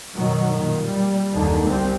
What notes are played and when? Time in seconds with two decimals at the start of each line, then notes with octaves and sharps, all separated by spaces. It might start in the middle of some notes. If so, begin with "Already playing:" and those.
0.15 F#2 B2 D#3 F#3
0.51 A#2 D#3
0.84 G3
1.33 F#1 D#2 D3 D#3
1.66 G1 C2 G3 C4